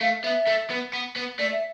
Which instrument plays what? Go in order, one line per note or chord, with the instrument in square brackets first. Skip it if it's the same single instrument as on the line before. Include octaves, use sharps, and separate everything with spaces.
[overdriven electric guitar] A3 [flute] F5
[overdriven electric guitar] B3 [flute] E5
[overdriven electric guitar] A3
B3
B3
B3
[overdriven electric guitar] A3 [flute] D5
[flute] E5